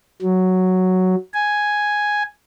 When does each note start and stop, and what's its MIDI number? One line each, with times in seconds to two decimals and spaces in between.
0.22 1.15 54
1.33 2.23 80